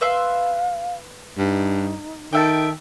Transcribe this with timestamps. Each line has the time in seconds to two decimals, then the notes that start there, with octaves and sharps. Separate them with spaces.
0.01 B4 E5 F5 C6
1.38 G2 D#4
2.33 D#3 A4 E5 G5